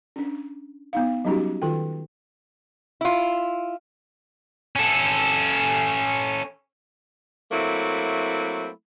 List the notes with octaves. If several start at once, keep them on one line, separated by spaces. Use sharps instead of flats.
C#4 D4
B3 D#4 F5
F#3 G3 C#4 D#4 F#4 G4
D#3 F4 A4 G5
E4 F4
C#4 A4
F#3 A3 A#3 C4 E4